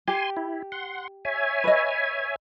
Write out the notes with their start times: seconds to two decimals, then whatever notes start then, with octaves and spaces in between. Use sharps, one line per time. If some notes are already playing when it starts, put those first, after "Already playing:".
0.08 G4 G#5 C6
0.37 E4
0.72 F#5 C6
1.25 C#5 E5 G#5
1.64 B4 D#5